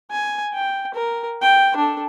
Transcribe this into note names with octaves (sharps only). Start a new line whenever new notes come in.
G#5
G5
A#4
G5
D4 A4